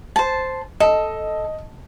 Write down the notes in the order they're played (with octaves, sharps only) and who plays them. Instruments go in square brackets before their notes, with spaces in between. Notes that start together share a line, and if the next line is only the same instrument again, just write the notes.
[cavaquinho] C5 A5
[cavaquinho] A4 [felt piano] D#5